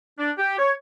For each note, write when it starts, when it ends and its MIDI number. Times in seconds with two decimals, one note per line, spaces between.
0.19 0.31 62
0.39 0.55 67
0.59 0.72 73